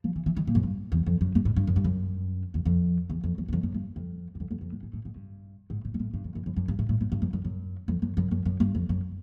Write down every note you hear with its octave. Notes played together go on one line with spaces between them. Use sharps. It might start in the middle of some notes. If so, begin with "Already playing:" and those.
F3
E3
E3
D#3
A#2
F#2
G2
E2
F2
F#2
G2
G#2
G2
F#2
G2
F#2
E2
F2
E2
F2
E2
E2
F2
F#2
G2
F2
F#2
F2
F2
F2
G#2
G#2
A2
G#2
G2
G#2
A2
G#2
A2
G2
F2
F#2
F#2
F#2
G2
A2
A2
G#2
G2
F#2
F#2
F#2
F2
F#2
F#2
F#2
F#2
G2
F2
F#2